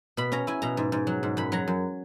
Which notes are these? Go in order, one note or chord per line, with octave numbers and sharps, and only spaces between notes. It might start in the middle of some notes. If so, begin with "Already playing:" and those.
B2 B5
C#4 A#5
E4 G#5
B2 A#5
G#2
G#2
F#3
G#2
F#2 B5
F#3 A#5
F#2